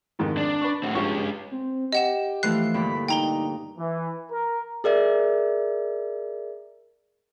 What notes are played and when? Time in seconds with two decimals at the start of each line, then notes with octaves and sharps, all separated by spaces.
0.19 F2 G#2 D#3
0.37 D4
0.61 B4 C#6
0.83 A2 C4
0.95 G2 F3 G#3 C#4 C#6
1.17 G2
1.52 C4
1.92 G4 D#5 F#5 E7
2.43 E3 F3 A3 F#6 C7
2.74 G2 A#2 D3 B5
3.08 D#4 G5 A#5 G7
3.77 E3
4.31 A#4
4.84 G#4 A#4 D5 E5